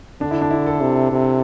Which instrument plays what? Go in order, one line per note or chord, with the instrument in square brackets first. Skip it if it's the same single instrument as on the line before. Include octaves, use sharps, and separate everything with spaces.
[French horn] D3 [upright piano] D4
[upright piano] E4
D4
E4
A4
[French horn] C3
C3